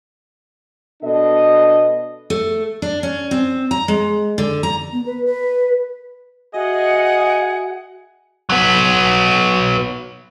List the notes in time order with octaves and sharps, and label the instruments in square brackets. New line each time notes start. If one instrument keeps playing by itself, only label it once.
[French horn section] B2 D4 A4 D#5
[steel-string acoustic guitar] A3
D4
C#4
C4
A#5
G#3
D3
A#5
[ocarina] B3
B4
B4
[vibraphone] F#4 E5 [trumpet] G#4 [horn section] D#5 [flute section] F#5
[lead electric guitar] F#3 B3